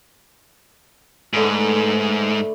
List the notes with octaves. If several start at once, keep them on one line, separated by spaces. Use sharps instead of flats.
G#2 D3 A3 B4